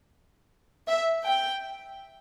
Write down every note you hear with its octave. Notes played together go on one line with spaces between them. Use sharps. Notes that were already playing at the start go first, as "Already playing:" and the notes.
E5
G5